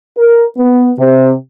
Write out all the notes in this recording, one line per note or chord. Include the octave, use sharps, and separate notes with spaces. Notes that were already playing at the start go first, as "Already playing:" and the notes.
A#4
B3
C3